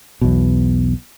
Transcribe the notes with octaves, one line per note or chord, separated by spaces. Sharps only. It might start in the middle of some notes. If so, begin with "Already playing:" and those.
B1 E2 B2